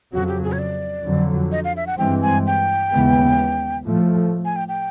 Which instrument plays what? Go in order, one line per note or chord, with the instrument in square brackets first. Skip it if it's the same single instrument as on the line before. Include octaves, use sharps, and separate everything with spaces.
[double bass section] F2 C#3 F#3 [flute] F#4
[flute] G4
G#4
C#5
D5
[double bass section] F2 D3 F#3
[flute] D#5
F5
E5
F#5
[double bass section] G2 E3 G#3 C4 [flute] G5
[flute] G#5
G5
[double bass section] D#2 C#3 E3 G#3 B3
A2 F3 A3
[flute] G#5
G5
G5